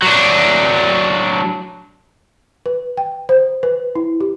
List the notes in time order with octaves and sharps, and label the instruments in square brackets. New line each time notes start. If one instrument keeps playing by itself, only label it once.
[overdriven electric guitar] F#3 D4
[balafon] B4
G5
C5
B4
E4
G4